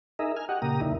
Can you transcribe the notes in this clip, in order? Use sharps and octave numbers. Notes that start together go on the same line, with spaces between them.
D#4 G#4 A#4 D#5 E5
G#5 F6
F#4 G4 D#5 F#5
A#2 C#3 A#3 G4 A#5 D#6
F2 D3 A#3 D#4 E4